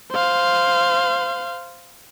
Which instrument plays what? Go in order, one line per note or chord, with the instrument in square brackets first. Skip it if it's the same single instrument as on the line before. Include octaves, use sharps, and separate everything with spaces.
[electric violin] C5 F5